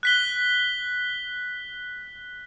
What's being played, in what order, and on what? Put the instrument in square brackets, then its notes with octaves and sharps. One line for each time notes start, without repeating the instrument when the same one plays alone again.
[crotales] F#6 B6 G7